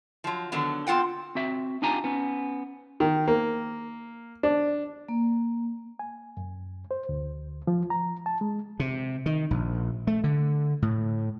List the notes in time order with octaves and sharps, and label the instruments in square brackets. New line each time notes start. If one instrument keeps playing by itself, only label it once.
[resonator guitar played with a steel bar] F3 F#3
D3 D#3 F#3 B3
B3 C4 F4 F#5 G5
[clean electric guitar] C4 F#4 E5
D4 D#4 F4 G4 G#5 A#5
B3 C#4
[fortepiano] D#3
A#3
D4
[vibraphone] A#3
[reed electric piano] G#5
F#2
C5
D2
F3
A#5
A5
G#3
[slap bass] C3
D#3
A#1
A3
D3
A2